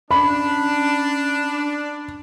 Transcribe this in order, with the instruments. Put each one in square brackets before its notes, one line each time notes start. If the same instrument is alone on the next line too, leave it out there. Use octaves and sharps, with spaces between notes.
[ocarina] C#4 [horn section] D4 [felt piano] B5